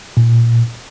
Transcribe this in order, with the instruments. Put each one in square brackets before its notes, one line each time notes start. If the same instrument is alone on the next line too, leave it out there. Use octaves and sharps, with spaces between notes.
[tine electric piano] A#2